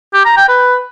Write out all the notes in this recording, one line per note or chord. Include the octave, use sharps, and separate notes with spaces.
G4
A#5
G5
B4